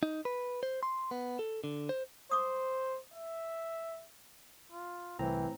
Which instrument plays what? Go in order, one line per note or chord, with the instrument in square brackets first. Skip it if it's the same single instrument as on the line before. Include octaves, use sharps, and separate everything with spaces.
[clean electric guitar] D#4
B4
C5
C6
B3
A4
D3
C5
[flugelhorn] C5 [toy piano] D6 D#6
[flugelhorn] E5
[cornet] F4
[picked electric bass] C2 [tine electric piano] A2 C4 A#5 [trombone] E3 [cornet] G5